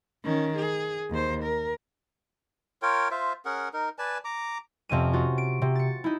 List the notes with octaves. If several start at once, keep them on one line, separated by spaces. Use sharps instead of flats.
D#3 C#4
G#4
D#2 C5
A#4
F4 A#4 C#5 G5
F4 C5 E5
C#4 G#4 A#4 F#5
D#4 A#4
B4 D5 G#5 A5
A#5 D6
F2 C3 C#4 D#7
F4 F#4
D7
C3
A6 C#7
D#4 E4